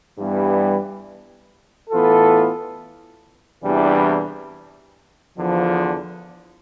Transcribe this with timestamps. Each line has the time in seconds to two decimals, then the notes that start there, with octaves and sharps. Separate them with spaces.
0.17 G2 E3 G3 B3
1.90 A2 E3 B3 F4 A4
3.63 E2 C3 E3 G3 D4
5.37 E2 D3 F3